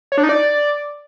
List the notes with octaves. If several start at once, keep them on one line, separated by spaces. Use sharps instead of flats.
C#5
D4
D#4
D5